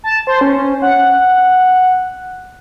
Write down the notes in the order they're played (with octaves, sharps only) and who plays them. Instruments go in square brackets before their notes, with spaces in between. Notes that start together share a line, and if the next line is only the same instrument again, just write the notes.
[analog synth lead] A5
C5
C#4
F#5